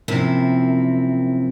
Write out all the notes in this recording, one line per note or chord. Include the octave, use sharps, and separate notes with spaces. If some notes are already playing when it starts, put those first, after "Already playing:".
F#2 C3 F3 A#3 C4 E4